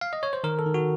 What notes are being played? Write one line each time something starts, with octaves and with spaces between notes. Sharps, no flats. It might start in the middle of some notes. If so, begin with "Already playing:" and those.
F5
D#5
C#5
C5
D#3 A#4
A4
D#3
F#4